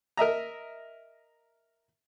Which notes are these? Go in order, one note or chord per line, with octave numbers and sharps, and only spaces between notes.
A#4 D#5 E5 A#5